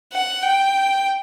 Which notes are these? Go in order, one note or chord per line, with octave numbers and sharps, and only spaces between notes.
F#5
G5